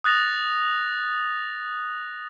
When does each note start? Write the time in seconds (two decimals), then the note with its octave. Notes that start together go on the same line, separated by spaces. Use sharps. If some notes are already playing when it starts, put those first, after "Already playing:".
0.04 D#6 F#6 A6 A#6 F7